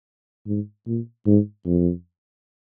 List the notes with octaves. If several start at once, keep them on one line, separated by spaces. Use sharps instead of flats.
G#2
A#2
G#2
F2